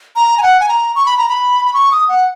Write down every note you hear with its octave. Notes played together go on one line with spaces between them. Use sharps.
A#5
G#5
F#5
G#5
A#5
C#6
B5
A#5
B5
B5
C#6
D#6
F#5